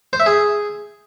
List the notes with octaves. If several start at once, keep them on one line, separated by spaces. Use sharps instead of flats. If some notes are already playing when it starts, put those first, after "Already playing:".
C5
E5
G#4